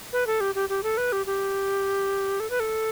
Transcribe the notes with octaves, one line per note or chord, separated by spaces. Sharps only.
B4
A4
G4
G4
G4
A4
B4
G4
G4
A4
B4
A4